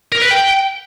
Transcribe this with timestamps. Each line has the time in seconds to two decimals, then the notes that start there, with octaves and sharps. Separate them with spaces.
0.12 A#4
0.21 B4
0.31 G5